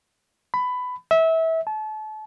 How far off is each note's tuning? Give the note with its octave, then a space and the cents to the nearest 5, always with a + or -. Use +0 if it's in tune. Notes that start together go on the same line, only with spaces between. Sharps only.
B5 +15
E5 -25
A5 -35